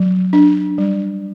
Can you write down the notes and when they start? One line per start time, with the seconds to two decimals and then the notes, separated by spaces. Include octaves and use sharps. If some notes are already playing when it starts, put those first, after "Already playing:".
Already playing: F#3
0.33 D4
0.78 G3